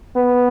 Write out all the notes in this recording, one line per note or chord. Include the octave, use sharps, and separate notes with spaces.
B3